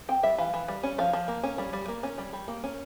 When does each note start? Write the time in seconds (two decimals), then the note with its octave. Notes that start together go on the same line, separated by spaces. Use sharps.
0.09 C4 G5
0.23 G3 E5
0.38 E3 F5
0.54 E3
0.68 G3
0.83 C#4
0.98 F3 F5
1.13 F3
1.28 A#3
1.43 C#4
1.58 G3
1.73 G3
1.88 A#3
2.03 C#4
2.18 G3
2.33 G3
2.48 A#3
2.64 C#4